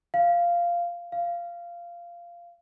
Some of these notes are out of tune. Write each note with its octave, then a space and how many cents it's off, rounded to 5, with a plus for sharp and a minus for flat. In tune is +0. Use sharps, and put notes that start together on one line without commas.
F5 -10
F5 -15